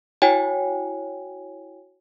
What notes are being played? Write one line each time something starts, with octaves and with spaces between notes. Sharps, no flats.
E4 F#4 C#5 G5 G#5